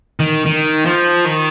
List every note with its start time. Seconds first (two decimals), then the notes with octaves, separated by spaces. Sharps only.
0.20 D#3
0.46 D#3
0.86 F3
1.25 D#3